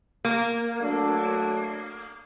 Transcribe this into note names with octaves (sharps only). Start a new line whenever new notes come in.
A#3
F#3 A3 D4